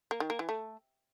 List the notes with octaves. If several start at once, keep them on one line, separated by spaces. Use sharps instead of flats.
A#3
D#3
A#3
E3
A3